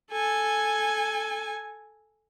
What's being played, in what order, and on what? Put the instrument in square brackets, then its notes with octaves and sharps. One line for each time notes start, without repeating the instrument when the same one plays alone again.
[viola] A4 G#5